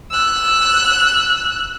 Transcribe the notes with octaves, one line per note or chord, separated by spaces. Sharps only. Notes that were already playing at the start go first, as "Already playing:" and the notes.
E6 F#6